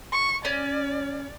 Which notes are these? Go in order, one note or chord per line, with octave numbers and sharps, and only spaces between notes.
C#6
C#4 D5